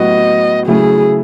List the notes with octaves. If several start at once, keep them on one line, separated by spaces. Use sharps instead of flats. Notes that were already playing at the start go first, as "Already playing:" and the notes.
Already playing: A2 F#3 B3 F#4 D#5
C#3 F#3 A3 E4 G#4